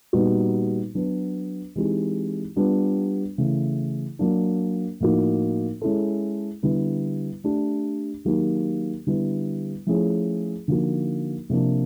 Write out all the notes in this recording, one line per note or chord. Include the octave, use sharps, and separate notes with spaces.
A#2 G3 B3 D#4 F#4
F#3 B3 D4
E3 G#3 C4 D#4 G4
G3 B3 D4 F4
C#3 E3 A3
F#3 A#3 D4
A2 F3 A#3 D#4 F#4
G#3 C#4 E4 A4
D3 G3 B3 E4
A3 D4 G4
D#3 F#3 A#3 D#4 G4
D3 G3 B3 E4
F3 A3 C#4 E4 G#4
D3 F3 A#3 D#4 F#4
C3 F3 A#3 D4